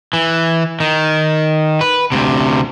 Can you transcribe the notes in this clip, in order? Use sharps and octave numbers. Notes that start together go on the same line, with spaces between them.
E3
D#3
B4
D2 C3